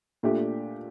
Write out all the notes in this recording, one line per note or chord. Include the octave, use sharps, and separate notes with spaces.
A#2 A3 D4 G4